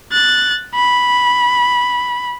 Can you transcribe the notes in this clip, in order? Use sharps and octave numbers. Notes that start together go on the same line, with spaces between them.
F#6 A6
B5